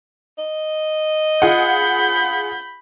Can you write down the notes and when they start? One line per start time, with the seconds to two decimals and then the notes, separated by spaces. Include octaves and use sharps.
0.38 D#5
1.42 F4 G#4 F#5 B5 G6